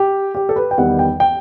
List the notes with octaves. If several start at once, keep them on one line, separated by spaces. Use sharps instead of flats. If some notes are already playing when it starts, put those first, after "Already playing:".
Already playing: G4
G4
A4
B4
G5
E2 D#3 G3 F#5
G5
G5